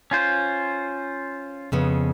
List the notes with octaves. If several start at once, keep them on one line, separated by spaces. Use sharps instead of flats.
C#4 F4 C5
F2 C#3 B3